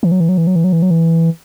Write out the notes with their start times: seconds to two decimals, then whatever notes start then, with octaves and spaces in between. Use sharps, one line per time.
0.03 E3
0.12 F#3
0.20 E3
0.29 F#3
0.38 E3
0.47 F#3
0.56 E3
0.64 F#3
0.73 E3
0.82 F#3
0.91 E3